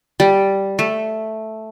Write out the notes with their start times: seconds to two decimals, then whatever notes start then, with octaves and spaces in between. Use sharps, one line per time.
0.20 G3
0.79 A3